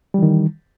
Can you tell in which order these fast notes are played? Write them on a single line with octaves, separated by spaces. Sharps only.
G3 E3 D#3